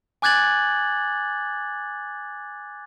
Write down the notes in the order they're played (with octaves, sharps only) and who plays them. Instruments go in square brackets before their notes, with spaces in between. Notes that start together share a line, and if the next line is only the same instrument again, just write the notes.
[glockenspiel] G#5 D6 F#6 G#6 A6 F#7